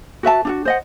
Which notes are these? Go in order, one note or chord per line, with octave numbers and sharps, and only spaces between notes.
F#4 B4 E5 A5
D4 F4 F#4
C5 D#5 F#5